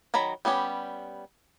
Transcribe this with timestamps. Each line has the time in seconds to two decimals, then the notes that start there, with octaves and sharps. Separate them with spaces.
0.14 D#3 F#3 A#5 B5
0.45 G3 B3 C#4 G4